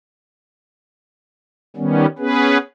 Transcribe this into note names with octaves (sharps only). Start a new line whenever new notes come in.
D#3 G3 B3 C#4
B3 C#4 G#4 B4